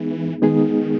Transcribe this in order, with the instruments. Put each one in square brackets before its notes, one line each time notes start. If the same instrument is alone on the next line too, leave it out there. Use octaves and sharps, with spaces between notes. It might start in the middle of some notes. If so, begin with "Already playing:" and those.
Already playing: [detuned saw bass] E3 [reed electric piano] G#3 B3 D#4 G#4
[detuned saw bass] D#3 [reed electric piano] G#3 B3 D#4 G#4